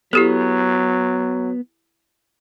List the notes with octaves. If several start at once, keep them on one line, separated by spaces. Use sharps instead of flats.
F#3 B3 E4 G4 A4